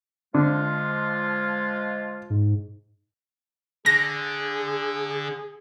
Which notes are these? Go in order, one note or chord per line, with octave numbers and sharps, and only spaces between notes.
D3 F3 G#3 F4
G#2
D3 G#4 A#6